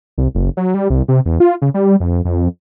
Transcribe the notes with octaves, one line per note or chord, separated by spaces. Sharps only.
C2
F#1
F#3
G3
C2
C3
E2
F4
C#3
G3
F2
F2